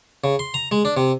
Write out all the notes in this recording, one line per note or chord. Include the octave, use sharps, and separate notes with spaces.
C#3
C6
A#5
G#3
D4
C3